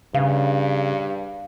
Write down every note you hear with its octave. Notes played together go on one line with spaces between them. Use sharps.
G2 C#3 F5